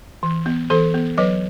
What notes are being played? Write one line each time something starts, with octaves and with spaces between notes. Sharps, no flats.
E3
B3
E3 A4 C5
B3
F#3 B4 D#5